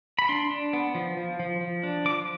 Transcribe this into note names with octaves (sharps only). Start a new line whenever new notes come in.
B5
D4 C6
D4
B3
F3
F3
F3
F3
D4
F3 D6